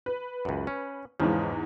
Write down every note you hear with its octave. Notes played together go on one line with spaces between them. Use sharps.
B4
C#2 F#2
C#4
E2 G#2 C#3 E3 F3